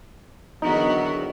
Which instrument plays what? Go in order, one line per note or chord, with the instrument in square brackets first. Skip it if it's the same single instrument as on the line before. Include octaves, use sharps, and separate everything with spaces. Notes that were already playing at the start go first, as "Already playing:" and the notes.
[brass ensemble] E2 D#3 F#3 [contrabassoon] D3 [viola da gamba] B3 F#4 A#4 [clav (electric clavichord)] D#4